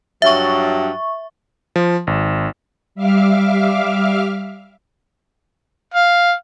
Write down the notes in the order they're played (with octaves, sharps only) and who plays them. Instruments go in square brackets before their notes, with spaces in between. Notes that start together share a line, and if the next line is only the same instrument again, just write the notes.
[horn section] G2 F#3 [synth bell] E5 C#6
[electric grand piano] F3
G#1
[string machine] G3 E5 F5 D6 F6
[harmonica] F5